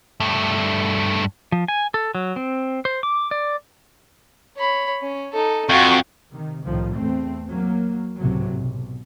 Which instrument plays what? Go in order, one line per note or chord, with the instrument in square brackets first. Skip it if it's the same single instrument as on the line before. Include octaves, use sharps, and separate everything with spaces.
[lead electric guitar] G2 A3
[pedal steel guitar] F3
G#5
A4
F#3
C4
C5
D6
D5
[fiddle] C#5 B5
C#4
D#4 A4
[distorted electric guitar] F2 [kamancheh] F#4 C#6 [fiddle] F5 G5
[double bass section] C3 D#3
C2 A2 D#3 F3
E2 A3 C4
F#3 A#3
G#1 C#2 A2 C3 F#3
B1